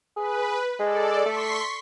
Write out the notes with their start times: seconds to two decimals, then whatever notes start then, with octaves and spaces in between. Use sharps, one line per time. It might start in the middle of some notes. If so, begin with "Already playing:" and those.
0.16 G#4 B4
0.79 G#3 A4 D5
1.26 A3 C6 C#6 B6